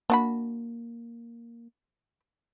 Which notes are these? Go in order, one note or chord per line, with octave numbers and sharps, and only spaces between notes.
A#3 D4 F#4 B5